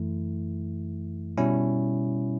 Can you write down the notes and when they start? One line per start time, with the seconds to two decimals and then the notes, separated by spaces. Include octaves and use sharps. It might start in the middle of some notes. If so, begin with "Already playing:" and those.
Already playing: F#2 E3 A3 E4
1.37 B2 G3 C#4 E4